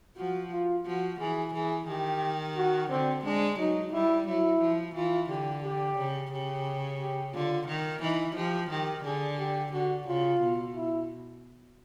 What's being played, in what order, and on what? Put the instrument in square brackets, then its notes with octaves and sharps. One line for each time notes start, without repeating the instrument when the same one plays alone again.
[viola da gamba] F3 [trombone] F#4
[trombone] F4
[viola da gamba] F3 [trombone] F#4
[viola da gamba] E3 [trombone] G#4
[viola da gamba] E3 [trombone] G#4
[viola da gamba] D#3 [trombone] G4
[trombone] F#4
[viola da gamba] D3 [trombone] C4
[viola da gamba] G#3 [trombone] D4
[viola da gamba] F#3 [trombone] D#4
[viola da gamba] G3 [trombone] E4
[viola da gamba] F#3 [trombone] E4
[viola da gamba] F3
[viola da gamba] E3 [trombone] F4
[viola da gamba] D3 [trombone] G4
[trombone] G4
[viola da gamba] C#3
[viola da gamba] C#3 [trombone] G4
[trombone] G4
[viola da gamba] D3 [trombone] F4
[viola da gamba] D#3
[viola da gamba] E3 [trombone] D#4
[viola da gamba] F3 [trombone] G4
[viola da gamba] D#3 [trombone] G4
[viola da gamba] D3 [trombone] G#4
[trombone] G4
[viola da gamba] D3 [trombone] F#4
[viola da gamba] C#3 [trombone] F4
[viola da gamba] B2
[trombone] E4